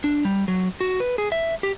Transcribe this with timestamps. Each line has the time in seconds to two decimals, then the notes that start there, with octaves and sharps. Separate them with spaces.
0.04 D4
0.25 G3
0.48 F#3
0.81 F#4
1.00 B4
1.18 G#4
1.32 E5
1.63 G4